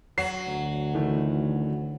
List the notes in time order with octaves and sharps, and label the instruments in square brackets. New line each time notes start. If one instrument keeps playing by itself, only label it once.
[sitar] F#3 [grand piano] C7 F#7
[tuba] D2
[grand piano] D#3 E3 A3